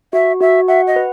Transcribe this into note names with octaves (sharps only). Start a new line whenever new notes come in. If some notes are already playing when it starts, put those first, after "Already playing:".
F#4 E5
F#4 E5
E5 F#5
D#5
B4